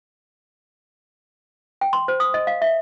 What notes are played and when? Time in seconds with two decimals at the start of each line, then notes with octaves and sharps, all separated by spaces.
1.81 G5
1.93 C6
2.08 C5
2.20 D#6
2.34 D#5
2.47 F5
2.62 E5